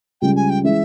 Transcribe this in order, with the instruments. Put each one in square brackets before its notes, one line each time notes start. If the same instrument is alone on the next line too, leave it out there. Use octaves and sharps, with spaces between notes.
[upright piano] C#2 C#3 G3 [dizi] G5
[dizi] G#5
G5
[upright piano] E3 G#3 C#4 [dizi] E5